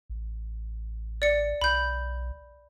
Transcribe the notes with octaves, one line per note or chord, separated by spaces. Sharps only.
A1
D5 C#7
B1 B5 G6